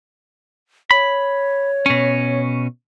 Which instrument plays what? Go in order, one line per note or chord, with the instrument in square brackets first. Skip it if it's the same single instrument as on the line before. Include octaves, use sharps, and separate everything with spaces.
[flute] C#5 [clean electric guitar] B5
[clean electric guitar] B2 C#4